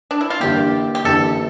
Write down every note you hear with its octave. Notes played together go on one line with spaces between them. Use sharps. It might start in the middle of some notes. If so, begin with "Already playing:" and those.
D4
E4
F4
G1 G2 E3 A#3 G4
G4
G1 G2 E3 A#3 A4